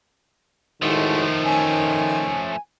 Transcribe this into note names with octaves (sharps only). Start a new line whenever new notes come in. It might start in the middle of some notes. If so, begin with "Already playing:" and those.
A2 D#3 F3 G#3 A3 F#4
C#4 G#5